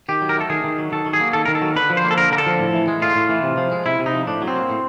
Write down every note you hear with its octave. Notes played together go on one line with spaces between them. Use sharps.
D#3 G4
F#3
A#4
A3 A4
D#3 G#4
D#3
F#3
D#3 A4
F#3
G#4
A#3
D#3 A4
D#3 A#4
A4
F#3
D3 B4
F3
C5
A#3
A4
D3 A#4
D3 A#4
A4
F3
A2
E3
G#3
A2 F4
A2
E3
C3
F3
G#3
C3 E4
C3
D#4
F3
A2 D4
F#3
C4
A#3
A2